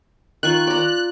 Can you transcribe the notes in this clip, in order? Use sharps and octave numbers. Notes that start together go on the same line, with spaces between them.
D#3 F4 C#6 F#6
D5 A#5